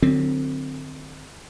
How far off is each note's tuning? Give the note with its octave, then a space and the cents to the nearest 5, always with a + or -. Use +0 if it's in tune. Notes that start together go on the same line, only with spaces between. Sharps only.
D3 +35 F#3 +0 C4 +0